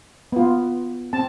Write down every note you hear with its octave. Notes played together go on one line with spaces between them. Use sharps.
B3 F4
C4 A5